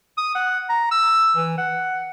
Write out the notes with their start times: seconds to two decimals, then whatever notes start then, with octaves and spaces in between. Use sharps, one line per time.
0.18 D#6
0.35 F#5
0.69 A#5
0.91 E6
1.37 E3
1.58 F#5